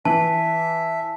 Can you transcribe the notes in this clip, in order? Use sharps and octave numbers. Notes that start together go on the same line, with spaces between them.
E3 E5 A5